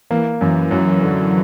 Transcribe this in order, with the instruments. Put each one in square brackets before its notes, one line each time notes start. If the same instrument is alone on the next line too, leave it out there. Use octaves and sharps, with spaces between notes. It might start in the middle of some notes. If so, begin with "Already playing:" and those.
[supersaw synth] E3 [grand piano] A#3
[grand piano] F#2 [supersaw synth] E3
[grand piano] F#2 [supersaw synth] F#3
[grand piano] D3